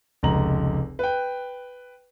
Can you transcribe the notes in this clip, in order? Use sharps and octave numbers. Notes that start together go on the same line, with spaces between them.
F1 C#2 A#5 F#7
B4 G5